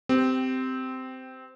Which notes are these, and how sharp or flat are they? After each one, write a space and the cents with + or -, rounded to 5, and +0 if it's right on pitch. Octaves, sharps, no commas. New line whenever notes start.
C4 -15 G4 +0